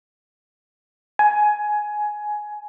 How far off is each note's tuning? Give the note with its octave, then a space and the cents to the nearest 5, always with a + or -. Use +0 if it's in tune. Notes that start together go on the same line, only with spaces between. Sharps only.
G#5 +15